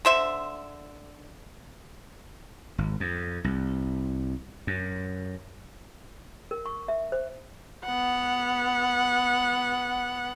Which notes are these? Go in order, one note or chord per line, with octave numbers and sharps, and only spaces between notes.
D3 C5 E5
G#1
F2
C2
F#2
A#4
C#6
E5
C5
B3 F#5